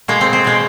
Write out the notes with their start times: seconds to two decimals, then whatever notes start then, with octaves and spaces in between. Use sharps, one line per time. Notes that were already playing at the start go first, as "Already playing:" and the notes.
0.08 B2 G#3 A#3
0.21 C4
0.33 C4
0.44 B2 G#3